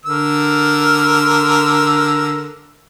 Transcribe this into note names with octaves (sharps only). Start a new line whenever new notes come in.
D3 A#4 E6